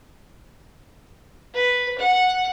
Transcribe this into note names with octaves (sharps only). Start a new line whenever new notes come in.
B4
F#5